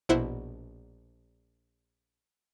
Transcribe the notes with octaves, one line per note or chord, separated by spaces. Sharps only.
A#1 B2 E4 C5 F#5